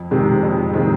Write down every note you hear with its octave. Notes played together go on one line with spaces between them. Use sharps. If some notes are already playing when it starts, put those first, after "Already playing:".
Already playing: F2
C3 D#3 G#3 C4
F2
C3 D#3 G#3 C4